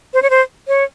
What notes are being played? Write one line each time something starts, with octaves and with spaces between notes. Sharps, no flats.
C5
C#5
C5
C#5